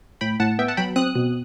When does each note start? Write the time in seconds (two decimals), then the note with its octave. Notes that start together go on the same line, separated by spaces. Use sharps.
0.21 A2 G5 B5
0.40 A2 F#5 A5
0.59 B3 E5 G5
0.68 F#5 A5
0.77 F#3 G5 B5
0.96 C4 D#6 F#6
1.15 B2